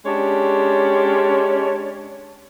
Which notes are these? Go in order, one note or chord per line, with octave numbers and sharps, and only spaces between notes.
G#3 C#4 D4 G4 C#5